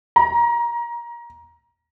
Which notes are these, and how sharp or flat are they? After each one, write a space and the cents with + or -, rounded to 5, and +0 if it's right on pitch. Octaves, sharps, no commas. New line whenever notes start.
A#5 +20